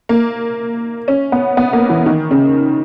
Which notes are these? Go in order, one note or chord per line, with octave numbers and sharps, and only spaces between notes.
A#3
C#4
B3
B3
A#3
E3
D#3
C#3